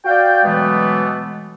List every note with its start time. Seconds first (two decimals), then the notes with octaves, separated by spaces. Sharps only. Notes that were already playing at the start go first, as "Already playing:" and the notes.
0.06 F#4 D5 F5 G5
0.44 B2 E3 F#3 G#3 A3 B3